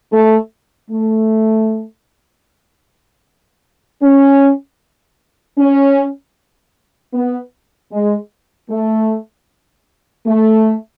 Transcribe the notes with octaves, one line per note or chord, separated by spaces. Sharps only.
A3
A3
C#4
C#4
B3
G#3
A3
A3